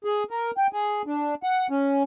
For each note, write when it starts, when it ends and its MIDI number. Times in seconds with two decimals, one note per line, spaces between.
0.05 0.23 68
0.31 0.51 70
0.57 0.67 79
0.73 1.02 68
1.06 1.34 62
1.43 1.67 78
1.70 2.03 61